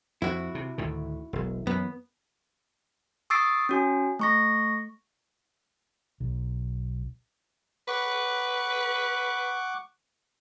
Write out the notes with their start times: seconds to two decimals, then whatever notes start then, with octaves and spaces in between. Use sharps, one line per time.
0.22 F2 E4 F#4
0.55 C3
0.78 D2 A2 D#3
1.33 E1 B1
1.67 F#2 E3 B3
3.30 C#6 D#6 E6 A6 C7 D7
3.69 C#4 F#4 G#5
4.19 A3 C#6 A#6
6.20 B1
7.88 B4 F#5 C#6 D6